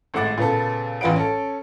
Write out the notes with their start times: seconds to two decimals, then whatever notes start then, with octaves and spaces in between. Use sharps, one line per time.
0.14 G#1 A2 G#3 F#5 D6 A6
0.37 A#2 C#3 B3 A4
1.01 A1 E2 F4 B4 F#5 D7
1.16 C#4 A4